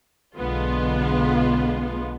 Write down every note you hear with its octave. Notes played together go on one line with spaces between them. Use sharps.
B1 D3 G#3 B3 F4